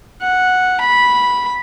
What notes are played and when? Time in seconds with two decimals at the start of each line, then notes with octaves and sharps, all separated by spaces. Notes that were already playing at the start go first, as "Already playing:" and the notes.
0.22 F#5
0.81 B5